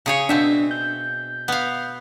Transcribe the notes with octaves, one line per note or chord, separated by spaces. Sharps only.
C#3 G#4 C#5
B2 C4 D4 E5
G6
B3 F5